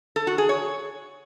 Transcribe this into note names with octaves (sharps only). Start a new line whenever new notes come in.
A4
F#4
G#4
C#5